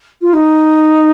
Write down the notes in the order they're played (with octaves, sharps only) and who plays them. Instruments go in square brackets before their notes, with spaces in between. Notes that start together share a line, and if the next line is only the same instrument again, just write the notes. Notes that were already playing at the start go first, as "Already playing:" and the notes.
[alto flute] F4
D#4